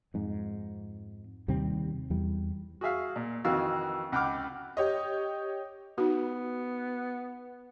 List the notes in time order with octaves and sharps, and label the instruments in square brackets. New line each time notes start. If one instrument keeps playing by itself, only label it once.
[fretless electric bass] F2 G#2
D#2 C3 G3 C4
E2 G3
[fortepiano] F#4 G#4 E5 F5
A#2
F2 D#3 E3 F#4 F5 E6
C#2 F#5 G5 B5 D6 F6
[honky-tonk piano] G4 C#5 D#5
[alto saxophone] B3 [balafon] D#4 F#4